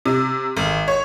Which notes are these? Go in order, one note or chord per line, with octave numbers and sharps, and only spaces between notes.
C3
G#1
C#5